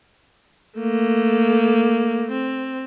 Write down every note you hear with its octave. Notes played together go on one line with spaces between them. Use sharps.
A3 A#3
C4